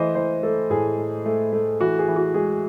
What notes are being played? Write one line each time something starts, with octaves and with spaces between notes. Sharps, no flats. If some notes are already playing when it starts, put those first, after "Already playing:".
Already playing: E3 A3 C5 D#5
E3 C5
A3 A4
A2 G#4
A3
A3
A3
E3 F#4
G#4
E3
F#4
G#3 G#4